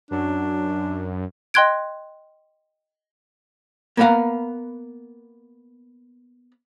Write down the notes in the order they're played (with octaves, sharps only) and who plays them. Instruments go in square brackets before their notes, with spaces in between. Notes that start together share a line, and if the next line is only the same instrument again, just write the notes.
[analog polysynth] F#2 [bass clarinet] D4
[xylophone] D#5 G5 C6 F#6 G#6 D7
[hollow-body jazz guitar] A#3 B3 B4 D5 F5 A#5